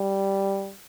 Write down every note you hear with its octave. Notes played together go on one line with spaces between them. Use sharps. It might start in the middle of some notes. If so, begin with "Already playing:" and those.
Already playing: G3